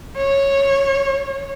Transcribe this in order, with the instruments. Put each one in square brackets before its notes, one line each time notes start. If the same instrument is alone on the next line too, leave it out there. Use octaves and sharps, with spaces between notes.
[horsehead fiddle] C#5